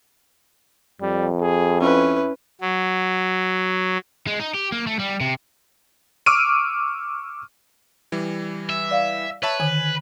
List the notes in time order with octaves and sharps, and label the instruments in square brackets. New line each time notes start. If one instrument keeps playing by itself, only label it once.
[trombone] F2 [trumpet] G3
[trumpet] G#4
[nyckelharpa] C#4 B4 [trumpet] E4
[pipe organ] F#3
[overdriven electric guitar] G#3
D#4
G4
A#3
A3
G3
C3
[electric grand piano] C#6 D6 E6 F6 D7 D#7
E3 G3
[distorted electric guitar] E5
[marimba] D5 F5
[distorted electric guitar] B4 [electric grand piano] C#5 E5 A5
[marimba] D3 D#3 [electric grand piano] G#5